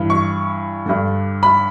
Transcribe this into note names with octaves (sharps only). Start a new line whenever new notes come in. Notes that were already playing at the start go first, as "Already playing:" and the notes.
Already playing: G2 E3
C#6
G2 D3
B5